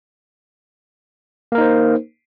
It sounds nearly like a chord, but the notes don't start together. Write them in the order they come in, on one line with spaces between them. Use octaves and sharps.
A#3 A#4 D#4 C5